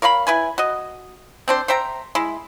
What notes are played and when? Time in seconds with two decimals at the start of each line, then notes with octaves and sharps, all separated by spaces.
0.02 A#4 C#5 F5 B5
0.27 E4 B4 G#5
0.58 F#4 D#5
1.48 C4 D4 C5
1.68 C5 E5 G5 A#5
2.15 G#3 E4